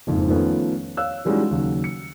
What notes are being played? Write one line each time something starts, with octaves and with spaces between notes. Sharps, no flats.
F#1 F2 G#2
D#3 F3 A3 B3 C#4
C#5 F5 E6 F#6
E3 G3 G#3 C#4 D#4 F#4
D#2 C#3 F#3
C#7